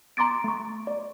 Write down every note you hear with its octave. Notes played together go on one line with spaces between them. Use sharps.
A#5 C6 D6 A6 D7
A3 C#6
D5